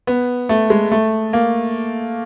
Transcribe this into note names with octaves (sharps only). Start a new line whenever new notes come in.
B3
A3
G#3
A3
A#3